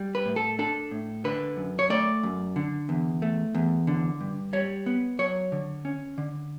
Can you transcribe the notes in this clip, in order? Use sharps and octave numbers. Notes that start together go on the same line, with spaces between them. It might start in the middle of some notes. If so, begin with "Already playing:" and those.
Already playing: G3
B4
A2
A4
D4 A4
A2
D3 B4
F#2
C#5
A3 D5
F#2
D3
E2
A3
E2
D3
G2
G3 C#5
B3
F#3 C#5
D3
C#4
D3